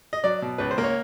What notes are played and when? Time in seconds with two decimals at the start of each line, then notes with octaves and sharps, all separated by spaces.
0.13 D#5
0.24 F#3 D5
0.42 B2
0.58 C#2 B4
0.71 C5
0.78 A#3
0.84 C#5